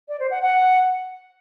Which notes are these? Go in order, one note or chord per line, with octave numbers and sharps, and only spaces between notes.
D5
C5
F#5
F#5